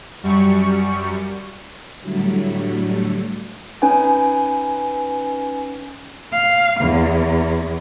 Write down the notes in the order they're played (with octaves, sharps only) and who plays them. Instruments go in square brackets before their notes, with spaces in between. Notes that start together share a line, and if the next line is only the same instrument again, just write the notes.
[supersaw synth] F#2 G3 C#6
[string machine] A2 D3 F#3 G3 A3
[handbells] C#4 D#4 B4 G5 G#5
[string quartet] F5
E2